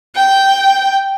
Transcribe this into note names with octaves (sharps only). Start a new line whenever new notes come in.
G5